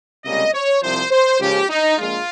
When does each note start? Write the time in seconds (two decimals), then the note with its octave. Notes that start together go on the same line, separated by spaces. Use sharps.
0.24 C#2 C3 G3 A#3 C#4 D#5
0.53 C#5
0.82 C2 C3 F3 C5
1.11 C5
1.40 C#2 C#3 F3 A#3 C#4 G4
1.70 D#4
1.98 A#1 A#2 G#3 F4